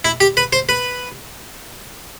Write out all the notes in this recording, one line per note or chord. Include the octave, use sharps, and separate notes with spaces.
E4
G4
B4
C5
B4